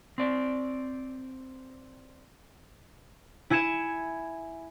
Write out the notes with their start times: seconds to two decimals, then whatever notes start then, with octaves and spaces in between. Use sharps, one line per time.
0.18 C4 D5
3.50 E4 G#5 G#6 C#7 E7